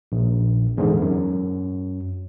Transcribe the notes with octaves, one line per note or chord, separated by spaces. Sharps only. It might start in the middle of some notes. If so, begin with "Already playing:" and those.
A#1
E2 G#2 D3
F#2